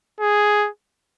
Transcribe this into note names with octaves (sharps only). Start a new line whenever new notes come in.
G#4